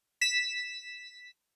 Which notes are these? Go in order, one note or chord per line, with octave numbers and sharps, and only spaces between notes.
B6 E7